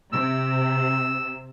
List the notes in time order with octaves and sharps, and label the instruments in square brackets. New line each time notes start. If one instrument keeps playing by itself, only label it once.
[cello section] C3 [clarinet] E6